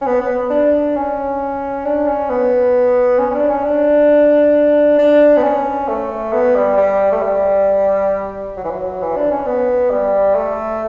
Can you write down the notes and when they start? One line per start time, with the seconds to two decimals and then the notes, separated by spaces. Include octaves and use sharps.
0.01 C#4
0.06 B3
0.20 B3
0.50 D4
0.95 C#4
1.85 D4
2.07 C#4
2.29 B3
3.19 C#4
3.31 C#4
3.34 D4
3.49 C#4
3.65 D4
4.98 D4
5.37 B3
5.43 C#4
5.88 A3
6.33 B3
6.56 G3
6.77 G3
7.12 A3
7.22 G3
8.57 F#3
8.64 E3
8.70 F#3
9.02 E3
9.16 D4
9.31 C#4
9.46 B3
9.91 G3
10.35 A3